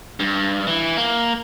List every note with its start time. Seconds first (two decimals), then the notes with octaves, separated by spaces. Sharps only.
0.20 G2
0.67 E3
0.97 A#3